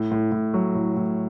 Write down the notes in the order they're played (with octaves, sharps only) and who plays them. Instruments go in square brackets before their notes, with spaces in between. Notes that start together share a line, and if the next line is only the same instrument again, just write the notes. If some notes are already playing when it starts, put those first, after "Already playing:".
Already playing: [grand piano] A2
A2
A2
F#3
A2
A2